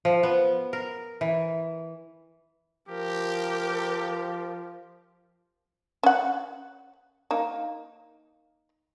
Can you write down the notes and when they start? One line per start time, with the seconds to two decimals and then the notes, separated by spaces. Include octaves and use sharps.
0.05 F3
0.23 B3
0.73 A#4
1.21 E3
2.89 F3 G4 A#4
6.03 C#4 F#5
7.31 A#3 D#4